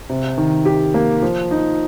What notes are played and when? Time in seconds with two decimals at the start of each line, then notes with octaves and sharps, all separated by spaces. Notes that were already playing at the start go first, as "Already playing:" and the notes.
0.10 C3
0.38 D#3
0.65 G4
0.94 A#3
1.22 F3
1.51 D#4